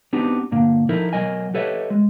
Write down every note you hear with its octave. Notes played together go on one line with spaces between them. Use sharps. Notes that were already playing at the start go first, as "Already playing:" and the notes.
B3 C4 D4 D#4 F#4 G4
G2 A#2 D3 A#3
F3 D#4 E4 A4 A#4
B1 F#3 A#4 D#5 G#5
G4 A4 B4 C#5 D#5 E5
G#3